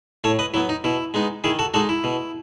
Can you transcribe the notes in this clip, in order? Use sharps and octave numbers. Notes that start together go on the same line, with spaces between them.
A2 A4 C#5
B4 D#5
F#3 B3 E4
D#4
B2 E4
G#3 B3 D#4
D#3 E4 G#4
F#4 A4
G#3 D#4 F#4 A4
E4
B2